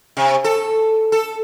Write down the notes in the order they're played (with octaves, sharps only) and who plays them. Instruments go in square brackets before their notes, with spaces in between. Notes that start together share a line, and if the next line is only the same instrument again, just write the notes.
[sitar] C3
A4
A4